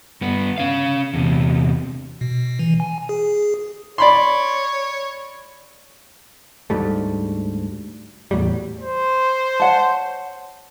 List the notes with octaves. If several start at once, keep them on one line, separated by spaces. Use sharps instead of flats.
G2 B3
C#4 F5
E2 C3
B2
E3
G#5
G#4
C#5 D5 B5 C6
D2 G#2 G3 A3
E2 A2 F#3 G3
C5
C#5 F#5 A5